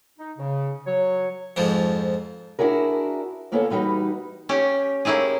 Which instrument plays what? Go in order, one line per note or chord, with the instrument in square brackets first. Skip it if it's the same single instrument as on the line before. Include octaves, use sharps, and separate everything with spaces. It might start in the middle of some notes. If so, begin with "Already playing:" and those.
[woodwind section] D#4
C#3
F#3 C#5
[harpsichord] F2 G#2 F3
[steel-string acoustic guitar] D4 E4 F#4 G#4 A#4
D2 A#3 B3 C#4 G#4 A4
E3 G3 D#4 F#4 B4
[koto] C#4 G4
A#3 C#4 E4 G4 G#4